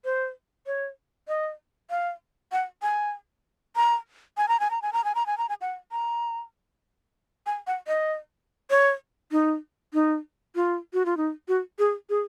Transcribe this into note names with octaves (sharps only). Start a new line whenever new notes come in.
C5
C#5
D#5
F5
F#5
G#5
A#5
G#5
A#5
G#5
A#5
G#5
A#5
G#5
A#5
G#5
A#5
G#5
F#5
A#5
G#5
F#5
D#5
C#5
D#4
D#4
F4
F#4
F4
D#4
F#4
G#4
G#4